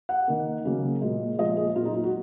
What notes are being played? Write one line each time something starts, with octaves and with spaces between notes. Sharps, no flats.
F#5
D#3 A#3
C#3 F#3 A#3
A#2 G#3
A#2 F3 G#3 D#5
G#4
A#2 F#3 A#3 F4
D#4
F4
F#4